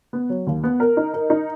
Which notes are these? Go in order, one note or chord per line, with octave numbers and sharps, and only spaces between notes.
B3
F#3
D#2
B3
A#4
D#4
A#4
D#4